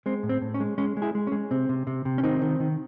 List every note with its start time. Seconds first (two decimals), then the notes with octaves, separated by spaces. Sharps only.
0.06 G#3 C4
0.23 A2
0.29 C4
0.42 A2
0.54 C#4
0.60 G#3
0.78 G#3 C#4
0.97 G#3
1.02 E4 G#4
1.15 G#3
1.27 C#4
1.32 G#3
1.51 C3 C4
1.69 C3
1.87 C3
2.05 C3
2.18 C#4
2.23 D#3 C4 D#4
2.42 D#3
2.60 D#3